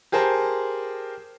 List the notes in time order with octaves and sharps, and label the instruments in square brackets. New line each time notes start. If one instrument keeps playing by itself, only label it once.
[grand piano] G4 G#4 A#4 C5 A5